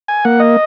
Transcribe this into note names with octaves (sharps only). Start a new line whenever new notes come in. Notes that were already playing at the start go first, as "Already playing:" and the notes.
G#5
A#3 F#5
D#5